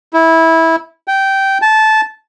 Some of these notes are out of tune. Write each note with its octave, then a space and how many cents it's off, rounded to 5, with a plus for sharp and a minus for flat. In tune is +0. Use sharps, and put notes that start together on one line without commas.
E4 -15
G5 -15
A5 -15